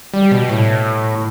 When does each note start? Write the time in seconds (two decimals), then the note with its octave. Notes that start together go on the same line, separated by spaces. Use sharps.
0.14 G3
0.32 B2
0.50 A2